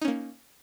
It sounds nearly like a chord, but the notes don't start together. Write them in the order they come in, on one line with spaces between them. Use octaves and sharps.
D#4 C#4 A#3